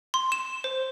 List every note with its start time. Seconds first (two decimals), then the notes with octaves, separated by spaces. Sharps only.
0.14 C6
0.32 E7
0.64 C5